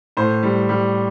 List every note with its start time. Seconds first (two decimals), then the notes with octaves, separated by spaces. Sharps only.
0.17 A2 C5
0.43 G3
0.69 G3